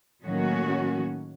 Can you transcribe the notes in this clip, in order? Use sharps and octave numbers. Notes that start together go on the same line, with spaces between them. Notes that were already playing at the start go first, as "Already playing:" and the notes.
A2 D#3 F#3 A#3 C#4 F#4